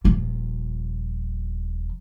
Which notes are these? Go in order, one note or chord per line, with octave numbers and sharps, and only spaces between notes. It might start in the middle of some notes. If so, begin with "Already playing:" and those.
D#1 F3